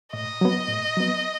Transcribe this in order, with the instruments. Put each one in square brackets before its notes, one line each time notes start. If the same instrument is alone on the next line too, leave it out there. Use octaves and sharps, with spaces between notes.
[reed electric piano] A2 [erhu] D#5
[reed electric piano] F#3 B3
A2
F#3 B3